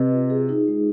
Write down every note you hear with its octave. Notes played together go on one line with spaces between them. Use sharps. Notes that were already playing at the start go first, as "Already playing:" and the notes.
Already playing: C3 B4 D#5
F4
G#4
D#4
G#3